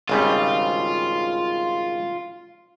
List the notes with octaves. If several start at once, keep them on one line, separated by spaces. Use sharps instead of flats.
G#1 C#3 G3 F4